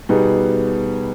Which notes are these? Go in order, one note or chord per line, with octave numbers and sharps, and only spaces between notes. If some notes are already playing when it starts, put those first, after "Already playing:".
B2 G3 B3 D#4 G#4